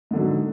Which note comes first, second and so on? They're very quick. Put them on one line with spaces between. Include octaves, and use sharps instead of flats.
G#2 D3 F#3